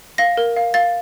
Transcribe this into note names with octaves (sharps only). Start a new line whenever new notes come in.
F5 A#6
A#4
F5
F5 A6